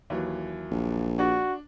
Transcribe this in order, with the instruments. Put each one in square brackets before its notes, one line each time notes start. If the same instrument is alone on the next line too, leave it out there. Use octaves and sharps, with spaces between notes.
[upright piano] D#2 E3 F#3
[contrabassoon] A#1
[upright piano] D4 [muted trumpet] F#4